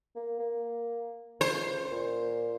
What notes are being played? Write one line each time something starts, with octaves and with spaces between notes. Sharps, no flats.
A#3
A#3
C#2 C5
A#2